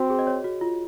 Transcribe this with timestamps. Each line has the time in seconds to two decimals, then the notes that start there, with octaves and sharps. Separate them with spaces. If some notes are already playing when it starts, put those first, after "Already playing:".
Already playing: C4 F#4
0.10 G#4
0.19 D#5
0.27 C#5
0.44 F#4
0.61 F4